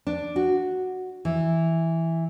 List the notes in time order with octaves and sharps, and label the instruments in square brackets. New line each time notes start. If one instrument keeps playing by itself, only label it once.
[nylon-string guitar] D4
F#4
E3